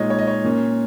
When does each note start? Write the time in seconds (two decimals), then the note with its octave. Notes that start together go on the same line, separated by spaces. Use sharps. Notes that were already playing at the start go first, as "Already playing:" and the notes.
Already playing: A#2 G#3 D#4 C#5 D#5
0.10 C#5
0.19 D#5
0.27 C#5
0.44 A#2 A#3 C#4